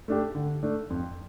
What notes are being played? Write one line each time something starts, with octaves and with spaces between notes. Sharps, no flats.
A3 D4 G4
D3
A3 D4
F2